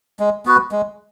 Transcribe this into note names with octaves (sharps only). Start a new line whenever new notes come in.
G#3
B3 F#4 B4
G#3